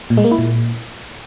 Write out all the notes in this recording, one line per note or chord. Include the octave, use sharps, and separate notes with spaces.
A#2
G#3
A#3
E4
A#2